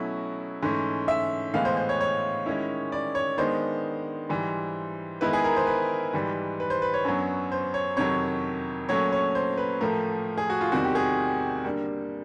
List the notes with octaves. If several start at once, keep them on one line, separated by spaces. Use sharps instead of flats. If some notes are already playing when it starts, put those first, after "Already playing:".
Already playing: B2 F#3 A3 C#4 E4
G#2 E3 A3 C#4
E5
A2 E3 G#3 B3 F5
C5
C5
C#5
C#5
D#3 G#3 C#4 E4
D5
C#5
D#3 G#3 B3 D4 C5
G#2 E3 G3
D#3 G#3 B3 E4 B4
G#4
A#4
C5
B4
G#2 E3 G3
B4
C5
B4
C#5
F#2 D3 F#3 B3
C5
C#5
F2 C3 D#3 F#3 C#5
A#2 F#3 A3 C#4 C#5
C#5
C5
B4
A2 F3 A3 A#4
G#4
F#4
F4
E2 C3 D#3 G3 C4 F#4
G4
G#4
D3 G3 A#3